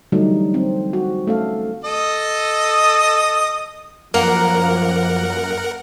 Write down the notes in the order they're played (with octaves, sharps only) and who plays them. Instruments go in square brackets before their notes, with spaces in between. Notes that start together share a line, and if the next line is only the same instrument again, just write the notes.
[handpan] D3 E3 F#3 G3 A3 D#4
C4
F#4
A3 C#4 A4 F5
[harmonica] A4 D#5 D#6
[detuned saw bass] F#2 [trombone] F3 [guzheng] A#3 [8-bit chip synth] A#4 F#5